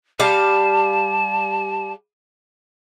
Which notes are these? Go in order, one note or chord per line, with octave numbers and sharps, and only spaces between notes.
G3 F5 A5